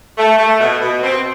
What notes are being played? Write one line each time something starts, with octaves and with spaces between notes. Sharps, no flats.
A3
A3
B2
B2
C4